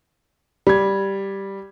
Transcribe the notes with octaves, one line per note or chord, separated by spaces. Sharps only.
G3 G#6